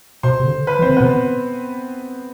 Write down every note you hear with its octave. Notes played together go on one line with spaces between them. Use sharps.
B2 C5 C6
C3
D3
B4 B5
E3
C4 C5
D3
B2 B3 B4